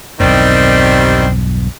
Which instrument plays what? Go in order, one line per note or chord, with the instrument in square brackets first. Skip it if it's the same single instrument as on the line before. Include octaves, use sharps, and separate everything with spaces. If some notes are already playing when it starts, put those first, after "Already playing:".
[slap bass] B1 E2 G2 [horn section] D#3 G3 C4